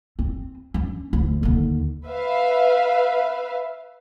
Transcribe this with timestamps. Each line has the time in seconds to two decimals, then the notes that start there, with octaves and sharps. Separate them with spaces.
0.19 C4
0.74 C#4 D4
1.13 D2
1.43 D#2 D3
2.07 B4 E5 F5